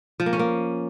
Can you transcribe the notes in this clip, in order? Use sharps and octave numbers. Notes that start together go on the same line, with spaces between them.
F3
A#3
C#4
A#3